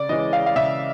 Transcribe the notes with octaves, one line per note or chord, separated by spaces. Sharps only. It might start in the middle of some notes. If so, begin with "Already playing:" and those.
Already playing: C#3 D5
E3 G#3 C#4 D#5
F5
F5
C#3 E5